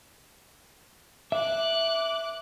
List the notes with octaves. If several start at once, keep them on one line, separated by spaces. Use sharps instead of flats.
E5 D6 F#6